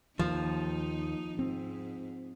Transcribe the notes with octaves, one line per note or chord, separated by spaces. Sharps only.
D#2 F3 D#4
G#2 C4